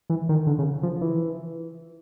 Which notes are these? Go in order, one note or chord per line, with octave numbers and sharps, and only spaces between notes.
E3
D#3
D3
C#3
F3
E3